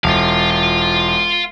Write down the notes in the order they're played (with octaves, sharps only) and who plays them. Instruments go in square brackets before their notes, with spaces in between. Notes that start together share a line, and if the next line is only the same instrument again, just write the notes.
[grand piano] E1 [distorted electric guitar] F4 F5